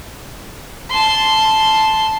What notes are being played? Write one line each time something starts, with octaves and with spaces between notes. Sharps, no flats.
A5 C6